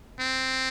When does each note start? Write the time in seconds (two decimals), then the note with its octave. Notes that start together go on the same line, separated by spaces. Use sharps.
0.20 C4